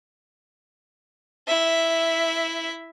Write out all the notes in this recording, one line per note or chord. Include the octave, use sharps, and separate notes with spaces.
E4 E5